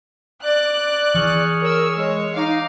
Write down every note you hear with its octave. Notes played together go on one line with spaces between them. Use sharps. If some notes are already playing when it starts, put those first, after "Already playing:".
D5 D6 F#6
E3 G#4 C#6 F6
A#4 C#5 E6
G#3 C#5
D#4 F5 D6